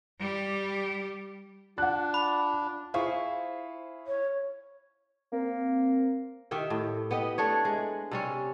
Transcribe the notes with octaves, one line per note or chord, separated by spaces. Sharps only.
G3 G4
D4 F4 F#5 F#6
B5
E4 F4 G#4 C5 C#6
C#5
A#3 C4
D#3 G4 E5 G5
A2
B3 G4 D#5
A3 D4 C#5
G#3
C3 G3 C#4